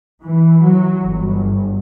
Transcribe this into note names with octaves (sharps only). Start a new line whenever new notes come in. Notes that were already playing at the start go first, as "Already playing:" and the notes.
E3
F#3
G1